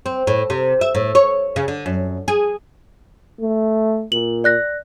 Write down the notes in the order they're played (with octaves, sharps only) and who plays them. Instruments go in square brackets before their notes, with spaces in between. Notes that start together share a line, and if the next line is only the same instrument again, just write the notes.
[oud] C4
A2
C3
E5
A2
C#5
C#3
D3
F#2
G#4
[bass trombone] A3
[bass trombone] A#2 [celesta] F#7
[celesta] D5 F#6 A#6